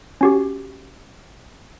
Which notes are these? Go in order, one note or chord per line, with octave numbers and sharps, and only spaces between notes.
C#4 F#4 G4